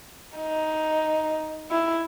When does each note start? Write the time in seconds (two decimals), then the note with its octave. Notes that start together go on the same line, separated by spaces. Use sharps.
0.37 D#4
1.71 E4